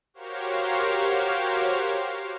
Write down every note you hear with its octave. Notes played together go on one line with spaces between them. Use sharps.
F#4 G4 A#4 C5 C#5 F5